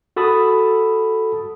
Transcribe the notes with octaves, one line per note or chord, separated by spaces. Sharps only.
F#4 A4 A5 B5 D#6